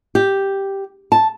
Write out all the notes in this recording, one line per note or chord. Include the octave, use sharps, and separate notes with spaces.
G4
A5